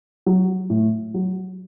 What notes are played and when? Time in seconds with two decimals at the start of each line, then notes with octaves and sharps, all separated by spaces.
0.26 F#3
0.70 A2
1.14 F#3